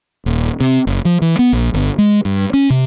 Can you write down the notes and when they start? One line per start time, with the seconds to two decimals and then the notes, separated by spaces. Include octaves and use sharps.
0.26 D#1
0.60 C3
0.87 F#1
1.05 F3
1.22 E3
1.39 B3
1.53 A#1
1.74 G1
1.98 G#3
2.25 G2
2.54 C#4
2.70 C3